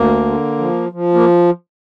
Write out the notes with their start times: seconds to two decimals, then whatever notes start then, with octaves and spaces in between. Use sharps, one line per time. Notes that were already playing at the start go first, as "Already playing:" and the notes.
Already playing: D2 A#3
0.25 D3
0.59 F3
0.92 F3
1.14 A#3